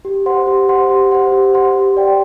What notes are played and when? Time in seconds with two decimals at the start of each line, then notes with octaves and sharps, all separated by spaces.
0.05 G4
0.26 C5 F#5 C6
0.47 G4
0.69 C5 F#5 C6
0.90 G4
1.11 C5 F#5 C6
1.32 G4
1.54 C5 F#5 C6
1.76 G4
1.97 D5 G5